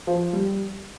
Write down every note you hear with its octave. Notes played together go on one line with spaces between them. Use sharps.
F3
G3